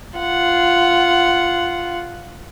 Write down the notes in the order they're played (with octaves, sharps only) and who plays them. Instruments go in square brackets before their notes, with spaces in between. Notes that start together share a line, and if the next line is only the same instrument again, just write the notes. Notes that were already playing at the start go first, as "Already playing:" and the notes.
[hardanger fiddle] F4 F#5